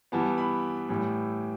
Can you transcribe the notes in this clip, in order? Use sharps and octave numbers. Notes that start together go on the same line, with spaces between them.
E3 G3 B3 A5
B5
A2 E3 G3